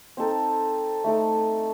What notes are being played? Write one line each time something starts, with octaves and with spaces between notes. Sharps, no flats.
C4 D#4 A4
A3 D#4 A4